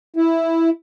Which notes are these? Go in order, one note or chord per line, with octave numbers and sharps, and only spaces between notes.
E4